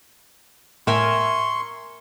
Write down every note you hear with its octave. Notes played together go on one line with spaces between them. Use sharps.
A2 A#4 E5 G#5 C6 C#6